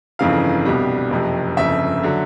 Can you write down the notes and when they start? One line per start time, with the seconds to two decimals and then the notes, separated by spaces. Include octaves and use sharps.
0.19 G1 F2 C#3 E3 F5
0.65 C2 B2 G3
1.11 F#1 F2 C3
1.57 G1 F2 C#3 E5
2.03 D3 F#3